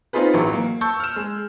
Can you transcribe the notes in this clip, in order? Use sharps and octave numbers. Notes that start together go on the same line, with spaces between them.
B3 C4 D#4 F4 G#4 B4
A1 A2 E3 F#3
A#3
A5 C#6 E6 G6
F6 E7
G#3